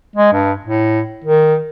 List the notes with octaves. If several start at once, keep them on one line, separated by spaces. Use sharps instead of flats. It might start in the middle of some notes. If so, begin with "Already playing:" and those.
G#3
G2
A2
D#3